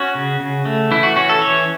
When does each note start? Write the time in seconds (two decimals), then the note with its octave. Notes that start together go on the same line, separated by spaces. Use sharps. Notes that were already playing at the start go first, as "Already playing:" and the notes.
Already playing: C#4 F#4
0.15 C#3
0.40 C#3
0.65 A3
0.91 E3 E4
1.03 F#4
1.16 C#4 F#4
1.29 A4
1.42 E3 C#5